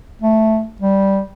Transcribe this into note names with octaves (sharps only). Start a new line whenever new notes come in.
A3
G3